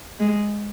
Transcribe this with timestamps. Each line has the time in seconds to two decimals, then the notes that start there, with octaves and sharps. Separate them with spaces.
0.20 G#3